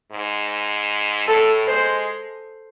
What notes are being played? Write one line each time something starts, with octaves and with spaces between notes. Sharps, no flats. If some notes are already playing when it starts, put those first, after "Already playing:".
G#2
A2 A4
G#3 C5